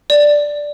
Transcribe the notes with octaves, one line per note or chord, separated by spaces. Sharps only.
D5